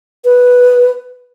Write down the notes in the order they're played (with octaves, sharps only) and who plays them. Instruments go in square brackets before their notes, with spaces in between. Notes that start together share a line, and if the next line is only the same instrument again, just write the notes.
[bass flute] B4